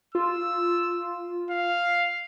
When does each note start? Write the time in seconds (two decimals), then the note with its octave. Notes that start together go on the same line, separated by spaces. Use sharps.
0.15 F4 E6
1.51 F5